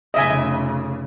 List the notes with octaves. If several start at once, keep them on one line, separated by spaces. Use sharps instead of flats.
F1 C#3 D#5 E5 G#5